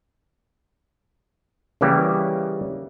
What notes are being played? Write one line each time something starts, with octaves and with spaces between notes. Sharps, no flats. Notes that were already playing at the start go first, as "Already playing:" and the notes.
C#3 E3 G3 A#3 G4